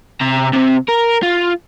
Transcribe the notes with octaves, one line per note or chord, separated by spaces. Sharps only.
C3 A#5
C3 C4
A#4
F4